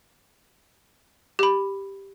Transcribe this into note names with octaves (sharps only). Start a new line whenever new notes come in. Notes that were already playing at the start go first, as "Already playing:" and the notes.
G4 B5